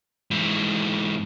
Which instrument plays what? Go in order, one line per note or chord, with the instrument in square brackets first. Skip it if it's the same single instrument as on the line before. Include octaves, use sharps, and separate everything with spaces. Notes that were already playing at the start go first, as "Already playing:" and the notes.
[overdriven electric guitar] G#2 E3